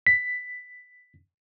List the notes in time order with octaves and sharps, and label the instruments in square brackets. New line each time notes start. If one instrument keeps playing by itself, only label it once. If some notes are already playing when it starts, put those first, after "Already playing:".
[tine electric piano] B6